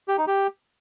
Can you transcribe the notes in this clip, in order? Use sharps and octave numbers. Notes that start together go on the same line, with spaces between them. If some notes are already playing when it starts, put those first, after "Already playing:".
G4
D#4
G4